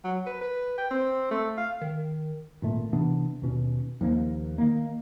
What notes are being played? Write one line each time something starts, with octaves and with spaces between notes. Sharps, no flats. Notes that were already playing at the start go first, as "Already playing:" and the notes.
F#3
B4
B4
G5
C4
A3
F5
D#3
G#1 A#2 A3
C3 E3 B3 D4
D#2 B2 C#4
D#2 F3 A3 A#3
D#3 A#3